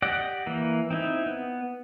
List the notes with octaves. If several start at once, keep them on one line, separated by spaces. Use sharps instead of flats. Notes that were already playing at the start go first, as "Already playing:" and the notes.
G4 D5 D#5 F#5
E3 A#3
C4 D#4 E4
B3